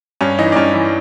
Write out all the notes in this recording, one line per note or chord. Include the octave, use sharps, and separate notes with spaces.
G2 C#4
E3 D#4
D4
G2 C#4
E3